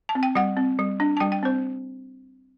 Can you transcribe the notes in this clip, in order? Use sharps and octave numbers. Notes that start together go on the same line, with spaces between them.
A5
C4
G5
G3 F#5
C4
G3
D4
A5
G3 G5
G5
C4 C5